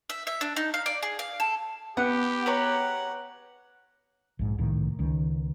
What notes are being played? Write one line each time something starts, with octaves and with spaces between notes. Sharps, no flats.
E5
E5
D4
D#4
F5
D5
G#4
F5
A4
B3 G4 F#5
B4 C#5 F#5 A#5
A#1 G#2
C2 A2 D#3
C#2 D#3